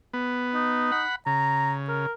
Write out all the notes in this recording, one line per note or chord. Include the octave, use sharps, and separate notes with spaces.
B3
D#4
F#5 B5
C#3 A#5
A#4